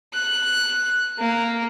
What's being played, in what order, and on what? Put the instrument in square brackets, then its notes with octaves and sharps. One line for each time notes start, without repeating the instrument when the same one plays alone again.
[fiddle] F#6
A#3